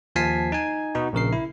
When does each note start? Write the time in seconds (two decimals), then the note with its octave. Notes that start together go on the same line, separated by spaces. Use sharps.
0.16 D#2 F3 G#5 A5 B6 C7
0.52 D#4 G#5
0.95 B2 B3 D#4 F#4
1.13 A#1 C#3 A#4 C7
1.33 E4